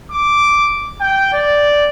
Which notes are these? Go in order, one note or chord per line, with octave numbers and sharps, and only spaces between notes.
D6
G5
D5